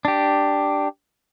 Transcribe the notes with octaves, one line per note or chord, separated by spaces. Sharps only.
D4 G4